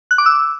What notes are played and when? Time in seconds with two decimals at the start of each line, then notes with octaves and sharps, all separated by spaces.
0.11 F#6
0.18 D6
0.26 E6